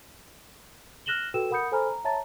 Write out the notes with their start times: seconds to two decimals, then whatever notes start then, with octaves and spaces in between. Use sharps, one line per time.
1.06 F6 F#6 A#6 E7 F#7 G7
1.34 F#4 A4 B4 G5 E6 E7
1.51 A#4 F#5 B5 D#6 G6 C#7
1.72 A4 C5 G#5 A#5 B5 F6
1.90 A#5
2.04 C#5 E5 A5 A#5 A6